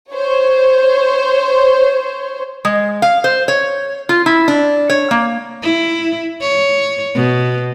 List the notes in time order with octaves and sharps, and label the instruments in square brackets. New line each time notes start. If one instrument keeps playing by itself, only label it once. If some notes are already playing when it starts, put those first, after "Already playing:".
[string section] C5 C#5
[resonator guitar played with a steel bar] G#3
F5
C5
C#5
F4
E4
D4
C#5
A#3
[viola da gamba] E4
C#5
B2